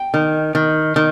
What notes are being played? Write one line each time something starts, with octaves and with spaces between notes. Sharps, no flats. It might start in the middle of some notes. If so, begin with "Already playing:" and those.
Already playing: G5
D#3
D#3
D#3